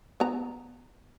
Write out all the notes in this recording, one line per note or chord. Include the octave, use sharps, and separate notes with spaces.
B3 A#5